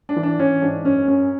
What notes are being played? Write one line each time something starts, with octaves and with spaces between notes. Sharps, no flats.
D4
E3
D4
E3 C#4
G#2 D4
F#2 C#4
F#2 C#4